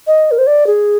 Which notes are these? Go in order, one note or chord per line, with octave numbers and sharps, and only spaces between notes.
D#5
A#4
C5
D5
G#4